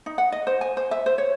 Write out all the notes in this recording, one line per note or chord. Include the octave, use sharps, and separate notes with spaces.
D#4
F#5
D#5
C5
G#5
C5
E5
C5
C#5